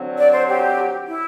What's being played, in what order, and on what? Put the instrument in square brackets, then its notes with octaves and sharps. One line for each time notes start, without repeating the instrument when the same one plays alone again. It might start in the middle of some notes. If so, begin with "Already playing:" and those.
Already playing: [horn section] D3 F#3 C4
[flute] D5
C5
G4
E4